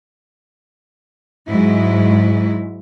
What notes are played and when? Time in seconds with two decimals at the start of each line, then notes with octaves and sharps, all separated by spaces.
1.48 G#2 F#3 G#3 E4